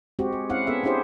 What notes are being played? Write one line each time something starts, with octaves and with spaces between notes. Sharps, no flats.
G#3 C4 F#4 G4
G#4
C4 C#4 E4 F5 F#5
B3 C#4 G#4 A4 E5
C#4 D4 E4 G4 G#4 C5